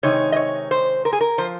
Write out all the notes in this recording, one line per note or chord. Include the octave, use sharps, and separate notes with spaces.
C3 D#3 G#3 D#4 C#5
D#5
C#5
C5
A#4
G#4
A#4
F3 C5